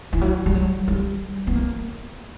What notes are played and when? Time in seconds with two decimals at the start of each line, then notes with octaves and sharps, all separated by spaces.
0.13 E3
0.21 F#3
0.46 G3
0.55 F#3
0.88 G3
1.47 B3
1.55 A#3